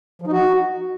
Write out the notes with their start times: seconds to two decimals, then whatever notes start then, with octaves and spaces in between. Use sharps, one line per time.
0.22 F3
0.27 D#4
0.33 F#4